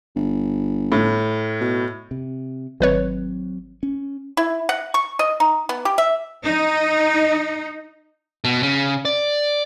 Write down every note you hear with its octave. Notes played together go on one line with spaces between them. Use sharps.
G1
A2
B2
C3
G#1 F#3 C4 B4 C#5
C#4
E4
F#5
C#6
D#5
D#4
B3
G4
E5
D#4
B2
C#3
D5